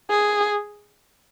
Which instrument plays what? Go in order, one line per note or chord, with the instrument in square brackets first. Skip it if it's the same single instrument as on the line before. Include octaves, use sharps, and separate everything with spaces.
[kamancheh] G#4